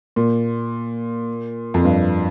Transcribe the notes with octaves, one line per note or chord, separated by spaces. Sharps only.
A#2
F2
G2